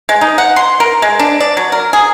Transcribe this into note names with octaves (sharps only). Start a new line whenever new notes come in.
G#3
D#4
F#5
C6
A#4
G#3
D4
D5
F#3
A#4
G#4